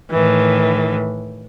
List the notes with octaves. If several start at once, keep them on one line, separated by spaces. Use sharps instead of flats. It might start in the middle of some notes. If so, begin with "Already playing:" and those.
A2 D#3 E3